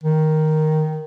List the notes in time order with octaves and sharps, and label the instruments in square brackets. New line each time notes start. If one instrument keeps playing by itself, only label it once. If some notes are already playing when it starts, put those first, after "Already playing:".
[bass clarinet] D#3